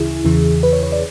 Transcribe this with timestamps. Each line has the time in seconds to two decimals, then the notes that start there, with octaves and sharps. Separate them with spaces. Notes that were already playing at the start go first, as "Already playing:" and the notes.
Already playing: D2 C#3 E3 E4 G#4
0.25 E2 C#3 E3
0.63 B4
0.73 C#5
0.83 C#5
0.92 D5